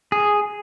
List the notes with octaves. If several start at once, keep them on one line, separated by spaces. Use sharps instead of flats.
G#4